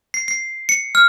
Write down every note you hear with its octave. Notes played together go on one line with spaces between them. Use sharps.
C7
C7
C#7
F6